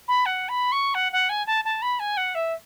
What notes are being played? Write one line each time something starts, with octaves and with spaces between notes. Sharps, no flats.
B5
F#5
B5
C#6
F#5
F#5
G#5
A5
A5
B5
G#5
F#5
E5